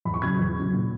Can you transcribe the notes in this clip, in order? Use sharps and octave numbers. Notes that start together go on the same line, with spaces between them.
E2 B5
C#6
C#3 F#3 G#6
E2
C#3 F#3
A#2